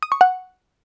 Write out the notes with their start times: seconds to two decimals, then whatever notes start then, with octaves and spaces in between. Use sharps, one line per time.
0.03 D#6
0.12 C#6
0.21 F#5